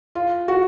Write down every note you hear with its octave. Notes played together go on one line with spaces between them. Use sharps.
F4
F#4